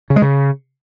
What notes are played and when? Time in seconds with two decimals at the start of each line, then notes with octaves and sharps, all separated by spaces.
0.10 C#3
0.16 G#3
0.22 C#3